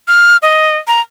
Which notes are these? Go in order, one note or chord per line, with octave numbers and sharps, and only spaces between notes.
F6
D#5
A#5